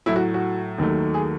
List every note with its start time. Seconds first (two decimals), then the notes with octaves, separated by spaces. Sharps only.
0.06 A2 F#3 A3 E4
0.16 F#4
0.34 F#4
0.78 D#2 D#3 F#3 A3
1.14 G#4